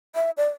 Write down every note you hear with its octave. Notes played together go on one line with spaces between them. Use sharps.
E5
D5